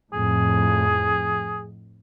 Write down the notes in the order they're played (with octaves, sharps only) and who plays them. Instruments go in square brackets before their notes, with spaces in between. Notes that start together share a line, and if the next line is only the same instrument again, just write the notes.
[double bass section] F2 A2 [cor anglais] G#4